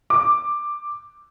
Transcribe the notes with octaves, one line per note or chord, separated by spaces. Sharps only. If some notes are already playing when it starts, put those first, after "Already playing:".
D6